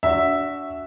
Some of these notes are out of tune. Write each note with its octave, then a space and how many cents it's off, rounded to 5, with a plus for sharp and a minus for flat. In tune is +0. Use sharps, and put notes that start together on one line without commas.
D4 -35 F#4 +0 E5 +0